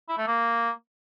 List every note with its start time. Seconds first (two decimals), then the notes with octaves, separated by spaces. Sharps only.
0.08 E4
0.18 A3
0.27 A#3